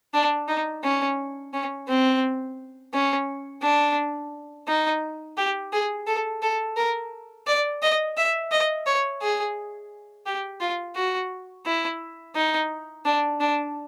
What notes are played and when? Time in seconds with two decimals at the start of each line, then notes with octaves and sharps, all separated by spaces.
0.14 D4
0.48 D#4
0.83 C#4
1.53 C#4
1.88 C4
2.93 C#4
3.62 D4
4.68 D#4
5.37 G4
5.73 G#4
6.07 A4
6.42 A4
6.77 A#4
7.47 D5
7.82 D#5
8.17 E5
8.52 D#5
8.86 C#5
9.21 G#4
10.26 G4
10.61 F4
10.96 F#4
11.66 E4
12.36 D#4
13.05 D4
13.40 D4